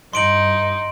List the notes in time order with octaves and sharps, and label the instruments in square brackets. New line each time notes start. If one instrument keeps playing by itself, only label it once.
[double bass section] G2 [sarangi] D#4 [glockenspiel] C6 D7 F#7